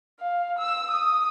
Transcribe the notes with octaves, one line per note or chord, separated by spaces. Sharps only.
F5
E6
D#6